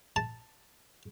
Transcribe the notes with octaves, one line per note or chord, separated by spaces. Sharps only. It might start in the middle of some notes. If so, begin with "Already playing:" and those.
A5